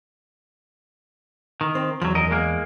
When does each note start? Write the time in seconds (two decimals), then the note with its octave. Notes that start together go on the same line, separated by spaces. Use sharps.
1.61 D#3
1.75 C4
2.02 E2 F3 F#3
2.15 F#2 A#4 D#5
2.31 G#3 A#3